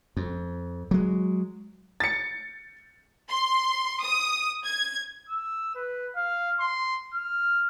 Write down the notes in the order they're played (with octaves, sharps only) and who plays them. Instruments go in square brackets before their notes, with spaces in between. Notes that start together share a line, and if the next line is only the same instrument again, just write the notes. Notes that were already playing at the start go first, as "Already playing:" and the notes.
[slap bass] F2
F#3 G#3
[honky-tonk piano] A6 C#7
[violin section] C6
D#6
G#6
[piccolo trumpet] E6
B4
F5
C6
F6